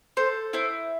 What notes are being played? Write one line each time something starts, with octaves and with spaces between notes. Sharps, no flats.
A4 C5
E4 C5